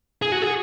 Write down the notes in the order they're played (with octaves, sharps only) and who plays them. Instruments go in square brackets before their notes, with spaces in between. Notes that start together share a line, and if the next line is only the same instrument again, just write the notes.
[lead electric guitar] G#4
F#4
G#4